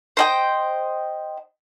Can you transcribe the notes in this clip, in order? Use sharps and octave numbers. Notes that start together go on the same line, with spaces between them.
C5 D#5 G5